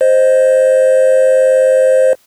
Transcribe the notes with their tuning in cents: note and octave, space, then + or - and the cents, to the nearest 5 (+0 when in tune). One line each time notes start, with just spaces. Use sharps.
C5 +0 D#5 +0